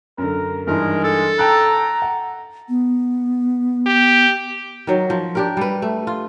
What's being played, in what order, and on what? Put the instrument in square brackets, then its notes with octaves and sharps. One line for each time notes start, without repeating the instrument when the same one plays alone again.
[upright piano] F#2 D3 [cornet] A#4
[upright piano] G2 E3 D#4 [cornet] G#3 [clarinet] A#4
[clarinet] A4
[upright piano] G5 A5 F#6 [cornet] A#5
[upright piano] F#5
[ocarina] B3
[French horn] G4
[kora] D#3 F#3
F3
D4 G4 A#4
G3 B4
A3
F4